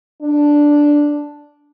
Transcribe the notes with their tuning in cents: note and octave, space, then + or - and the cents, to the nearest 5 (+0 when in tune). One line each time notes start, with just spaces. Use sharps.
D4 +0